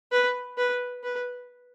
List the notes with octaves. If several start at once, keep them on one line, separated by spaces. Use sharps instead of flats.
B4
B4
B4